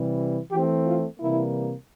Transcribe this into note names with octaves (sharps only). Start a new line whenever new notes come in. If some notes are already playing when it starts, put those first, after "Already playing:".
Already playing: C3 E3 G3
E3 A3 C4 G4
F4
C3 E3 G3 A#3 E4